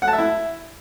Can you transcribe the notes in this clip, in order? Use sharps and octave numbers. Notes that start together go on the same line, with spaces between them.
F#5
A5
E5
E4